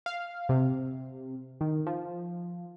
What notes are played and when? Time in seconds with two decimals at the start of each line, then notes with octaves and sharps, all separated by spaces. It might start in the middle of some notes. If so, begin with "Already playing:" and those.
0.06 F5
0.49 C3
1.61 D#3
1.87 F3